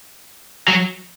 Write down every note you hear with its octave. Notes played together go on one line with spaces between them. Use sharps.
F#3